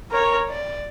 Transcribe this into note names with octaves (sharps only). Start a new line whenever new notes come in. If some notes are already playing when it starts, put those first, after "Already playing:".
A#4 C#5
D5